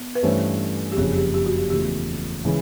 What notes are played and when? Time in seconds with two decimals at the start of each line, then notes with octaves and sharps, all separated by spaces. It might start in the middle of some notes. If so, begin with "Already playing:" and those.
Already playing: B3
0.15 B4
0.23 G2 E3 A3 C#4 C5
0.92 G4
0.97 F#1 F2 C#3 G#4
1.16 G4
1.34 G4
1.46 F#4
1.58 G4
1.70 E2 C#3 F3 A3 G4
2.45 C#3 E3 G#3